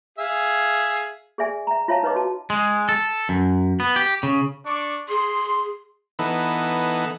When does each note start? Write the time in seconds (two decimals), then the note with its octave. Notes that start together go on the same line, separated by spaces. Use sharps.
0.18 G#4 E5 F5
1.38 G#4 D5 E5 G#5
1.67 E5 A#5
1.88 F4 C#5 E5 F5 A5 A#5
2.03 D#4 B4 C#5 D#5 D6
2.16 F#4 A5
2.50 G#3
2.89 A4
3.29 F#2
3.80 B3
3.96 G4
4.23 C#3
4.66 D4 C#6 D6
5.09 G#4 C6
6.19 E3 B3 D#4 A4